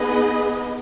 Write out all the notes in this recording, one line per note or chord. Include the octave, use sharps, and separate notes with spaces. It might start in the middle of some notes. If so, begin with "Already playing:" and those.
Already playing: B3 D#4 G#4 B4 D#5